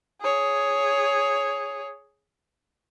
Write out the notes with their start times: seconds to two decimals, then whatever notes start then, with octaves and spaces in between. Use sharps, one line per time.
0.22 G#4 C#5